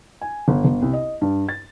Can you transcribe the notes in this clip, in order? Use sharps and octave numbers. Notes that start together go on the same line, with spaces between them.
G#5
G1
G1
C2
D#5
G2
A6